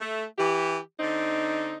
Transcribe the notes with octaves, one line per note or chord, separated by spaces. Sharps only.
A3
E3 G4
D3 C4 D#4